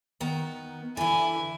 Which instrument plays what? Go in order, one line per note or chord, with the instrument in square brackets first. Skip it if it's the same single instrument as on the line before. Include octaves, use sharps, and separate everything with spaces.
[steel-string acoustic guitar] D#3 B3 A#5
[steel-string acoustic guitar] D3 E3 [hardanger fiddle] E4 G#5